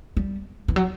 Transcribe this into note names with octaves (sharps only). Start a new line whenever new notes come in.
G3
E3
F#3